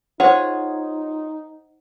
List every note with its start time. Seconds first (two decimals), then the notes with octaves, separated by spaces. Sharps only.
0.20 D#4 F4 G#4 C5 C#5 F#5